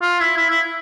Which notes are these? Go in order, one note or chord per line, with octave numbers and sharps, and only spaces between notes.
F4
E4
E4
E4